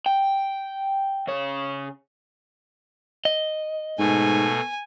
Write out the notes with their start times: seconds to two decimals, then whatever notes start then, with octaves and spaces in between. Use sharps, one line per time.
0.06 G5
1.27 C#3 C#5
3.25 D#5
3.99 G#2 B2 A3 G#5